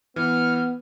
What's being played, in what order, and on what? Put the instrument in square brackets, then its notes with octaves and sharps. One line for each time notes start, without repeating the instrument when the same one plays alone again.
[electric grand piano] E3 [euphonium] B3 [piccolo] F6